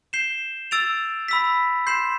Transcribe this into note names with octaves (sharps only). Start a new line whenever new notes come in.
G6 C7 E7 G7
E6 A6 D7 F7
B5 E6 B6
C6 G6 C7 E7